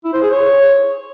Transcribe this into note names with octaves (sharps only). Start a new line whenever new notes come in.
E4
C5
G#4
C#5